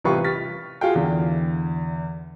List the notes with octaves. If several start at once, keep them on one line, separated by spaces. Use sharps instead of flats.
A1 C3 G3 F4 B4 C#6
F6 A6 B6
F4 F#4 G#4 F5 G5
E2 D3